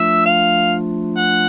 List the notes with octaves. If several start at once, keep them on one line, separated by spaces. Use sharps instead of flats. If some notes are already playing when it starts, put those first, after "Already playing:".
Already playing: F3 A3 D4 F4 E5
F5
F#5